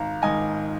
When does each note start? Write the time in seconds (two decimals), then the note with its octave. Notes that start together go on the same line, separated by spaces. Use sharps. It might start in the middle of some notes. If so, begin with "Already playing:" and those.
Already playing: G#1 F5 A#5
0.22 G#2 D#3 D#5 G#5